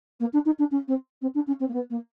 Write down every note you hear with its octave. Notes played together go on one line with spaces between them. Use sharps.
A#3
D4
D#4
D4
C#4
C4
C4
D4
C#4
C4
A#3
B3
A#3